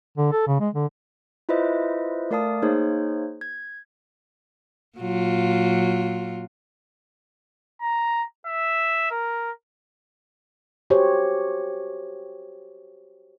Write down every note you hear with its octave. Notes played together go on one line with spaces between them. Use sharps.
D3
A4
C#3
G#3
D3
E4 F4 B4 C5 D#5 E5
A3 A#4 D5 F5 A5 D#6
A#3 D#4 G#4 C5 C#5
G#6
A#2 F#3 F4
A#5
E5
A#4
F#4 G4 C5 C#5